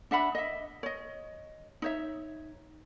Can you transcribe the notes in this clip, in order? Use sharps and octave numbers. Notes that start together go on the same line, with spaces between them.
D4 E5 F#5 B5
D#5 E5
C#5 D#5
D#4 C#5 E5